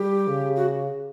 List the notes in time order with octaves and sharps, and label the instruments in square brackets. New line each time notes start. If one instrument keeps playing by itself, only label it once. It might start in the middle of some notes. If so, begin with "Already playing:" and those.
Already playing: [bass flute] G3 [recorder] G4
[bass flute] C#3
[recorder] F#4